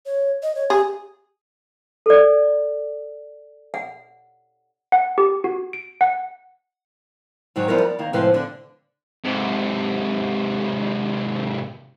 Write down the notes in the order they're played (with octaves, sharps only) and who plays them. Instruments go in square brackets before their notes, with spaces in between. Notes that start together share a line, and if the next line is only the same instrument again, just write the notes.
[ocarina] C#5
D#5
C#5
[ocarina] G4 [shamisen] G#4
[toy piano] A4 D5
F#5
[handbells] F#5
G4
F#4
D7
F#5
[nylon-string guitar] G#2 D#3 F#3 G3
F3 G3 B3 E4 F4 A#4
D5
D#3 A#3
A2 C3 F3 G#3 B4 C5
D3 D4
[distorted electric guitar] G#2 C3